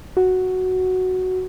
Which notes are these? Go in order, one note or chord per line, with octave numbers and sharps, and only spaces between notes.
F#4